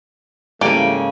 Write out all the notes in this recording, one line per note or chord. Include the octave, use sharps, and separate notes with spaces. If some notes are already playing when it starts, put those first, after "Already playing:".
G#2 C#3 E3 G3 A3 A#3 A4 G5